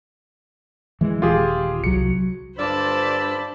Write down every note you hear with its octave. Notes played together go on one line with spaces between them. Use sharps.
E3 G#3
D#1 F4 G4 G#4
C2 F#3 C#7
G2 D3 F4 C5 D5 A5 B5 E6